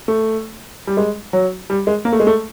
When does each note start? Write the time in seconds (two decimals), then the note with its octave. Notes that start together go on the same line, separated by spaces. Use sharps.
0.08 A3
0.87 G3
0.97 G#3
1.33 F#3
1.70 G3
1.87 G#3
2.05 A#3
2.12 A3
2.20 G#3
2.27 A3